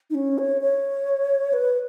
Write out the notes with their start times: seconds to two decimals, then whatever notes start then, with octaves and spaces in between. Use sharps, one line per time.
0.10 D#4
0.15 C#4
0.38 C#5
0.61 C#5
1.53 B4